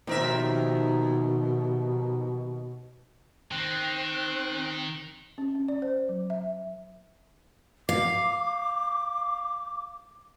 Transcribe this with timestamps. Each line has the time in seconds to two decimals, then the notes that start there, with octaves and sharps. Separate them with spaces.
0.07 D#2 B2 D#3 F3 C4 A#4 E5
3.51 D#3 C4 F#6
5.38 C#4
5.55 C#4
5.68 D5
5.82 C5
6.09 F#3
6.30 E5
7.89 F5 D6